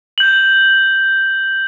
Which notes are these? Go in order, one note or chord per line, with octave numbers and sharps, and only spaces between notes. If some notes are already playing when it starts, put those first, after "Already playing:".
G6 F#7